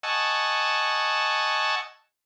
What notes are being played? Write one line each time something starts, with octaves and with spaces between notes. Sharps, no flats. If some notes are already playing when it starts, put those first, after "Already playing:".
D#5 F#5 G#5 A5 C#6 E6